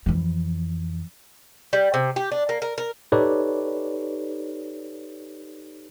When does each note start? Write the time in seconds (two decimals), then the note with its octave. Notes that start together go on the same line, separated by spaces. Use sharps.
0.06 F2 E3
1.73 G3
1.94 C3
2.16 G4
2.32 D4
2.49 A#3
2.62 A#4
2.78 A#4
3.12 D#4 G4 A4 B4 C#5 D5